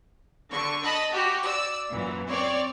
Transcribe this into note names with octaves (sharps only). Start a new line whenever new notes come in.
D3 C#6
D#5 A5 B5
F#4 G4
D5 E6
F#2 A#2 E3
C4 C#5 D5